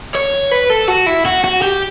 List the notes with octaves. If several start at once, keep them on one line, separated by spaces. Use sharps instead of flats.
C#5
B4
A4
F#4
E4
F#4
F#4
G4